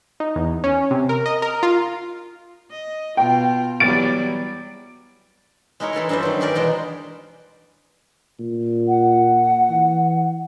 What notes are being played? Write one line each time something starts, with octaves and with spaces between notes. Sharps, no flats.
D#4
E2
C#4
C3
A#4
D#5
A#4
F4
D#5
B2 F4 G5
E2 F#3 G3 A6 D7
G#3 D#4 E4 A#4 C#5
E3 A4 B4 C6
G2 E3 F3 C#4 C5
D#3 F#3
D#4 G4 G#4 A#4 B4 D5
E2 B2 G#3 C5 G5
A#2
F#5
E3